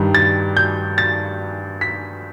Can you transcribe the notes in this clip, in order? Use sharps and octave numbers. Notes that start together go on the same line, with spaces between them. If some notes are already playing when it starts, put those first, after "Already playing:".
Already playing: G2 D#3 G3
A6
G6
A6
B6